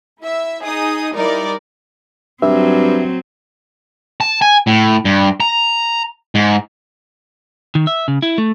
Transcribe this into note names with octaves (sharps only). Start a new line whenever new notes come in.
E4 E5
D#4 G#4 D#6
G3 D#4 E4 A#4 D5
G2 F#3 C4 E5
A5
G#5
A2
G2
A#5
G#2
D#3
E5
C#3
E4
A3